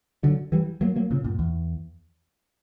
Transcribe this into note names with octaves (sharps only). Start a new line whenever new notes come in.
D3 F#3
E3 G3
F#3 A#3
F#3 A#3
A#2 C#3
F#2 A#2
E2